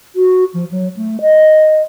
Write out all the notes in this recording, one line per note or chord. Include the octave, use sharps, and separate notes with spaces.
F#4
F3
F#3
A3
D#5